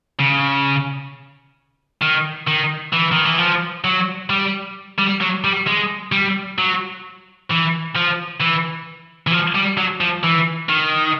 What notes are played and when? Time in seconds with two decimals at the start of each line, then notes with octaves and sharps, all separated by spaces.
0.19 C#3
2.02 D#3
2.47 D#3
2.93 E3
3.12 D#3
3.25 E3
3.38 F3
3.85 F#3
4.30 G3
4.99 G3
5.21 F#3
5.44 G3
5.67 G#3
6.12 G3
6.58 F#3
7.50 E3
7.95 F3
8.41 E3
9.27 E3
9.32 F3
9.55 G3
9.78 F#3
10.01 F3
10.23 E3
10.69 D#3